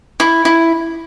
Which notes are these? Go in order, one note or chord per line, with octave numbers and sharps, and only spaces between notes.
E4
E4